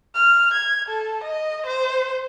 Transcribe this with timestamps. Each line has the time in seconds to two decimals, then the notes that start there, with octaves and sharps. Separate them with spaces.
0.15 F6
0.54 G#6
0.89 A4
1.24 D#5
1.67 C5